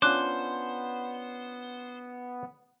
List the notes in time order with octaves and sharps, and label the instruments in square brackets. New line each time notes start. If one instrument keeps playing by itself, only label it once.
[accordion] B3 [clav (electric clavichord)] C#4 D4 F4 [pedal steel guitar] C5 [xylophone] D6 F#6